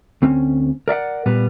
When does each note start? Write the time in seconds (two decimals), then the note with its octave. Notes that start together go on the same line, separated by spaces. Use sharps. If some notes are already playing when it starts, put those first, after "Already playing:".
0.22 D2 C4 C#4
0.88 A#4 D5 E5 F#5
1.26 A#2 G3 B3